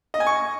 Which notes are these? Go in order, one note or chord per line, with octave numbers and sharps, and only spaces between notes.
D#5
G#5
C#6